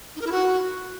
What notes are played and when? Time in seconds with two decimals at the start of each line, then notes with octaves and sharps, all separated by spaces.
0.16 D#4
0.21 A#4
0.27 E4
0.32 F#4